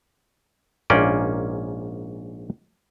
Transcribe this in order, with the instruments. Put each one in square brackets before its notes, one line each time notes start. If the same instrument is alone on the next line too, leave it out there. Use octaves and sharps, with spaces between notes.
[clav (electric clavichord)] A#1 G#2 A#3 C#4 D5 G5